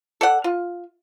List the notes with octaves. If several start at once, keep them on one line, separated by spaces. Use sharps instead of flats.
A4 D5 F#5
F4